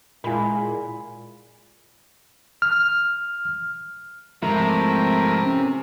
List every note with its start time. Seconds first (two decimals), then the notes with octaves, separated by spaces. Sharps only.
0.24 A#2 G#3 E4 F4 A#4 G#5 B5
2.62 F6
4.43 G#2 C3 F3 A3 E4 A#4
5.42 C#4